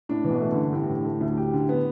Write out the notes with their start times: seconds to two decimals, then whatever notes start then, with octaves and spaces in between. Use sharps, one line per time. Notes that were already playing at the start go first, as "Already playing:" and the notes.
0.09 A2 D4
0.24 E3
0.30 B2
0.40 A3
0.51 G2 D3
0.73 A2 G4
0.89 D3
1.04 A3
1.20 D2
1.37 G4
1.54 D3
1.69 B3